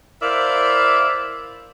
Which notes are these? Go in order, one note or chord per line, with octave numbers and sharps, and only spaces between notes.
E4 A#4 C5 D5 E5 F5